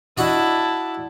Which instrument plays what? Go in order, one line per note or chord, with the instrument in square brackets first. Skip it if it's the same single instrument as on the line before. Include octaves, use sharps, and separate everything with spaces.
[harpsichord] D4 F#4 D#5 [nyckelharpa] E4 A5